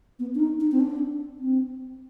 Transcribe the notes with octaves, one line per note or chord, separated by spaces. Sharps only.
B3
D4
D#4
D#4
C4
D4
C4